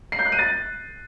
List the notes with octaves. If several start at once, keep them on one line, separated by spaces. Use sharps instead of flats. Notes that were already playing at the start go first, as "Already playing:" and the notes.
C7
G6
F#6
D#7
A6